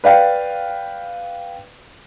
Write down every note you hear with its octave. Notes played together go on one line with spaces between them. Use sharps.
B4 D5 F5 G5